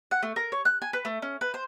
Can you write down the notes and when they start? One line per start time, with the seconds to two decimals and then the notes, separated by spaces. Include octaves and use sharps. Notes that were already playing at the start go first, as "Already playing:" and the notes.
0.11 F#5
0.23 A3
0.36 A#4
0.52 C#5
0.65 F#6
0.82 G#5
0.93 B4
1.05 A3
1.22 C#4
1.41 B4
1.54 C5